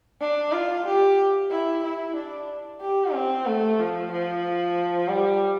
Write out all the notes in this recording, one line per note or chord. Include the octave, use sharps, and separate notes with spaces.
D4
F4
G4
E4
E4
D4
G4
C4
A3
F3
F3
G3